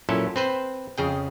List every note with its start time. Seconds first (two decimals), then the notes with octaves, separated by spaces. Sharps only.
0.09 A#2 F#3 C#4 E4 A4
0.36 C4 B4 C5
0.98 F2 C#3 G#4 G5